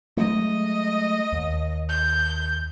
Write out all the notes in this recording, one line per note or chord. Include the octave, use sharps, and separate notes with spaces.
F#3 G#3 A3 D#5
D#2
G6